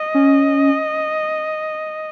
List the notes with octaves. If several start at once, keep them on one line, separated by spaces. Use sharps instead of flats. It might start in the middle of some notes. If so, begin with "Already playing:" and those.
Already playing: D#5
C#4